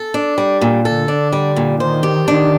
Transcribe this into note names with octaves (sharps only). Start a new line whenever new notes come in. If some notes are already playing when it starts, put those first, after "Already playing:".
Already playing: A4
D4
G3
A#2
D3 A4
D4
G3
A#2
D#3 C5
G4
D#3 D4